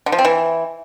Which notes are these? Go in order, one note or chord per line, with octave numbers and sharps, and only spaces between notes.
D3
F3
C4
E3